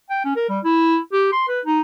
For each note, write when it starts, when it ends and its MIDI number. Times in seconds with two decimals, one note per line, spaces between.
0.10 0.21 79
0.25 0.36 61
0.36 0.49 70
0.49 0.59 55
0.64 0.98 64
1.13 1.29 67
1.33 1.46 84
1.48 1.60 71
1.66 1.81 63